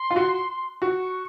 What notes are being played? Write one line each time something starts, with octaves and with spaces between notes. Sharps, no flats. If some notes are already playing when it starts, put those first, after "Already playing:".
Already playing: C6
F4
F#4
F#4 C#6